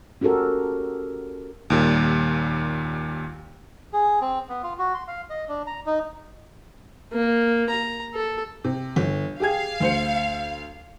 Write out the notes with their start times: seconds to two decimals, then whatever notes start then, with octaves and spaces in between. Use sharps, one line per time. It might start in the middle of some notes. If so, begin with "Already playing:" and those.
0.21 C#4 F#4 G4 A4 A#4
1.70 D#2 A#2 G3
3.93 G#4
4.21 C4
4.49 B3
4.63 F4
4.79 F#4
4.94 C6
5.08 F5
5.30 D#5
5.49 D4
5.67 A#5
5.86 D#4
7.12 A#3
7.69 A#5
8.14 A4
8.64 C3
8.96 G1
9.40 G4 G#4 F5 G#6
9.80 D2 C5 C#7